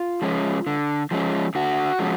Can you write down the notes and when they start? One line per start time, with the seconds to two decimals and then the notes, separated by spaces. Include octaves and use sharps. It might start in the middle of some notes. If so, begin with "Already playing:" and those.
Already playing: F4
0.22 F3 G#3 C#4
0.67 D3
1.11 F3 G#3 C#4
1.55 D3 F#4
1.99 F3 G#3 C#4